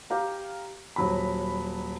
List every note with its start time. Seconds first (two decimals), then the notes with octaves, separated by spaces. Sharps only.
0.10 G4 F5 A#5
0.96 D#1 F#3 B5